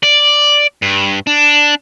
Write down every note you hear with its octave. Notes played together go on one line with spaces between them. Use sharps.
D5
G2
D4